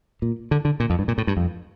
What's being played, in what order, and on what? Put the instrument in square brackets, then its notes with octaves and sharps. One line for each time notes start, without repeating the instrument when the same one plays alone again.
[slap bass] A#2
D3
D3
A#2
F2
G2
A#2
A2
G2
F2